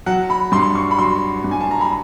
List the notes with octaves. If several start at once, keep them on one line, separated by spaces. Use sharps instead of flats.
F#3 F#5
B5
G2 C6
C#6
B5
F#3 C6
G2
G#5
A5
A#5
B5